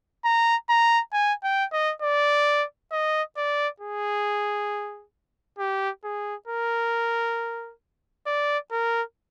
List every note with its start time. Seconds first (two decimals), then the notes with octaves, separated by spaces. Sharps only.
0.25 A#5
0.69 A#5
1.13 G#5
1.44 G5
1.72 D#5
2.02 D5
2.92 D#5
3.37 D5
3.80 G#4
5.59 G4
6.04 G#4
6.48 A#4
8.27 D5
8.71 A#4